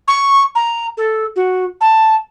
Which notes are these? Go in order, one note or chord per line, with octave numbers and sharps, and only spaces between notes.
C#6
A#5
A4
F#4
A5